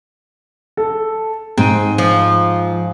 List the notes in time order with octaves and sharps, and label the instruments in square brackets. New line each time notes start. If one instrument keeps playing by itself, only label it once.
[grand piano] A4
[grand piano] G#2 D#7 [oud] C4
[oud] F3